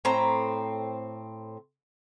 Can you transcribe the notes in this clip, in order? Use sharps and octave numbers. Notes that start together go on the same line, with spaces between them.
A2 C4 A#5